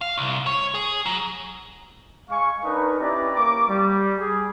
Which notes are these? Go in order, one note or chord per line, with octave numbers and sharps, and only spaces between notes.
F5
C2
C#5
G#4
F#3
G#3 F5 G#5 C#6
D4 D#4 A#4 B4
C#4 E4 G4 B4 D5 A#5
A#3 A#5 C#6 D6
G3
G#4